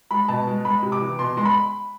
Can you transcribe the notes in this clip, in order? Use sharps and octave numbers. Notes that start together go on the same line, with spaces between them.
G#3 B5
B2 A5
G#3
G#3 B5
C3
D6
E3
B2 C6
G#3 C6
B5